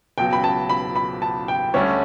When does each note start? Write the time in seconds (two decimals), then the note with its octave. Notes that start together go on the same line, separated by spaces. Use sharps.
0.18 C#2 B2 F#3 G5
0.33 B5
0.44 A5
0.69 B5
0.96 B5
1.22 A5
1.48 G5
1.74 D2 D3 G3 C#4 C#5